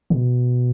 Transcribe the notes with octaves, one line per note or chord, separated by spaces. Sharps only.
B2